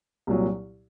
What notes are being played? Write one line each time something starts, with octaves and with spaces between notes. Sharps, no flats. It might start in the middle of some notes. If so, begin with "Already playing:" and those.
C2 A#2 F#3